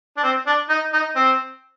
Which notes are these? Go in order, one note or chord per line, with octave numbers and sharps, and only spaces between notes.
D4
C4
D4
D#4
D#4
C4